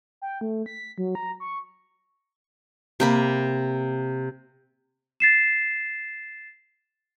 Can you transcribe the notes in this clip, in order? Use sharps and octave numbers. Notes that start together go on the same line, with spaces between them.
G5
A3
B6
F#3
A#5
C#6
C3 A#3 B5
A6 C7 E7